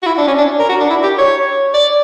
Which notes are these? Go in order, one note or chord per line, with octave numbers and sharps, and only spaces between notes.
F#4
E4
D4
C#4
D4
A#4
F#4
D4
E4
G4
C#5
D5